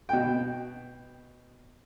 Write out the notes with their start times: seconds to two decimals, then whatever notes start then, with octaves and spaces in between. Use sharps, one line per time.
0.09 B2 G5